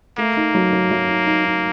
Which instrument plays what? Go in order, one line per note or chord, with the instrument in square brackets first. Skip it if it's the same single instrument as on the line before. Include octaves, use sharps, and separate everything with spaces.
[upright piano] A3 [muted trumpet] A#3
[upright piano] D#4
F#3
F#3
F#3
D#4
D#4
D#4